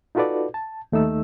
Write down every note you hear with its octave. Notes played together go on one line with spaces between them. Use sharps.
D#4 F4 F#4 A4 B4 D5
A5
D#2 A3 D#4 E6